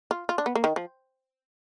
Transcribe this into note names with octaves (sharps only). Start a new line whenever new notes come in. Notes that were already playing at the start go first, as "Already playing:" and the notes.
F4
F4
D4
B3
A#3
D#3
F3